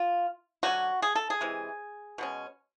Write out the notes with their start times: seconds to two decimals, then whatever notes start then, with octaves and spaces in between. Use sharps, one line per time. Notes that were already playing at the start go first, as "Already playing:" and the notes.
Already playing: F4
0.63 D3 F#3 A3 C#4 F#4
1.02 G#4
1.15 A4
1.30 G#4
1.41 C3 E3 G#3
2.18 B2 G#3 C#4